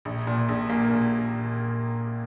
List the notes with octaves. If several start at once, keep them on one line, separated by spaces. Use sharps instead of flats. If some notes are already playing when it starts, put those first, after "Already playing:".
A#1
A#2
A#1
A#3
A#2